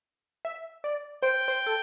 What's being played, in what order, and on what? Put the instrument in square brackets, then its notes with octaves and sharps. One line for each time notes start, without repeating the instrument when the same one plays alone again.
[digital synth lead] E5
D5
[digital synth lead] C5 [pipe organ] G5
[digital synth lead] C5
A4